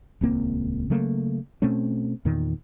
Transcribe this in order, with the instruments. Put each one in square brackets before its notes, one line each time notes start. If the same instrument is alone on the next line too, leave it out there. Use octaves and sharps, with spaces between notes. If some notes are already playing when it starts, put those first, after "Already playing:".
[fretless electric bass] D#1 C#2 A#3 C4
C#3 F#3 A3 A#3
B2 A3 C4 C#4
E2 A#2 D#3